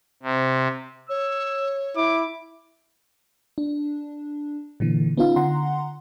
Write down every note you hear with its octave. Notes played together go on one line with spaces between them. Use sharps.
C3
C#5 E6
E4 D6
D4
A#2 D3 E3
B3 C#4 D#4 F4 F5
D3 F#5 A#5 C6